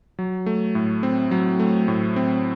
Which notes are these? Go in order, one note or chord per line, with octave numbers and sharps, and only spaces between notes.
F#3
A3
A2
C4
F#3
A3
A2
C4